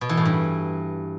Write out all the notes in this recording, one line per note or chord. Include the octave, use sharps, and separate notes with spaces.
B2
E3
A2
G2